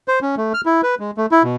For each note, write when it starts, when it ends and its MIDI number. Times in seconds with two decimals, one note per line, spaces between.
0.08 0.19 72
0.22 0.35 61
0.37 0.53 57
0.54 0.61 89
0.66 0.81 64
0.83 0.95 71
1.00 1.11 56
1.17 1.26 57
1.32 1.43 64
1.43 1.56 47